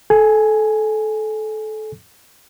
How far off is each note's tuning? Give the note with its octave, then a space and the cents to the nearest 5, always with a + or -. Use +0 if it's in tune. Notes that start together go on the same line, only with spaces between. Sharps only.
A4 -25 G#5 +0